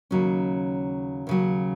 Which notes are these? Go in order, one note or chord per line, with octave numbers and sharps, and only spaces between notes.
D#2 C#3 F#3 C#4
D#2 C#3 F#3